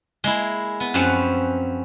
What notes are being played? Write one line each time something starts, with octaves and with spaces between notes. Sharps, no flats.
G#3 A#3 E4
B3
F#2 F3 C4 C#4 B4 F#5